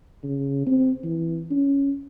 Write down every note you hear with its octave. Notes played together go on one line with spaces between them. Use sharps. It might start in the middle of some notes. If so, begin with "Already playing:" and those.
C#3
C4
E3
C#4